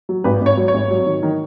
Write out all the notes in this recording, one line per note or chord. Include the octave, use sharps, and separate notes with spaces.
F#3
G#1 B4
G#1 C#5
F#3
C#5
G#1
F#3
D#3
D#3